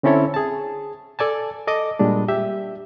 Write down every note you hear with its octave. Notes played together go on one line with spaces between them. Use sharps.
D3 C4 C#4 E4 A4 C#5
G#4 A5
A4 D5 G#5 A5
A4 D#5 D6 D#6
A#2 G3 G#3 D4
G4 E5